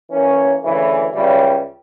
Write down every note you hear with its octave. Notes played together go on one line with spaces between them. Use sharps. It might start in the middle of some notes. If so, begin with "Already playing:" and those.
E3 A#3 C#4
D2 C#3 E3
C#2 C#3 E3 G3